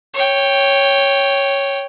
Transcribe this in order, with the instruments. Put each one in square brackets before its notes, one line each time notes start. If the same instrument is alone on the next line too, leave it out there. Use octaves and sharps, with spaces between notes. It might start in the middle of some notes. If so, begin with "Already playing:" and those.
[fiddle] C#5 G5